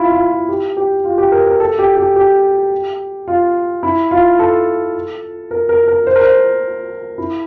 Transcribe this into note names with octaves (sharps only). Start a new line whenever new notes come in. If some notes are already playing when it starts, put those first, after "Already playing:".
Already playing: E4 F4
F4
F4
G4
G4
F4
G4
A#4
A#4
A4
G4
G4
G4
F4
E4
F4
A4
A#4
A#4
A#4
C5
A#4
C5
E4